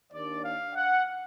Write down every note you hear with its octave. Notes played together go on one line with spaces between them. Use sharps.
D#2 D#3 A#3 D4 D5
F5
F#5